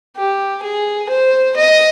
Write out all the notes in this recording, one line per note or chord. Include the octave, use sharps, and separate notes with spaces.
G4
G#4
C5
D#5